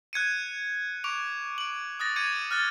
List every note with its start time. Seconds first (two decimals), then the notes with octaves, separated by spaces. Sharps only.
0.13 F#6 G#6 C#7 D#7
1.04 C#6 D6 D7 F7
1.58 D7 F#7
1.99 D#6 F#6 A6 A#6
2.16 D6 G#6 C#7 D#7
2.51 F6 F#6 A6